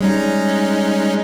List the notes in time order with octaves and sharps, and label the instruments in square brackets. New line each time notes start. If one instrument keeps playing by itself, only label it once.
[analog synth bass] G3 [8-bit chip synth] G#3 C#4 D#4